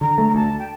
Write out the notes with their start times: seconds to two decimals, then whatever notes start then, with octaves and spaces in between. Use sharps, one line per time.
0.01 D3 A#5
0.18 A3
0.28 A#5
0.35 D2 A5
0.59 G5